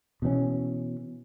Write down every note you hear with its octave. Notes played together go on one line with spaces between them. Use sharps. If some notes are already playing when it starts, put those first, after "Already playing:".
B2 E3 C4 C#4